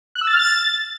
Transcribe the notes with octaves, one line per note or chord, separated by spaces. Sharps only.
F#6
E6
A6
F6
A6